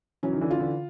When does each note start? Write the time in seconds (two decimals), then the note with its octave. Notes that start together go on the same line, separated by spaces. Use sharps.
0.23 E3 F#3 C#4
0.33 D#3
0.41 D3 E3
0.51 F4
0.59 D3 E3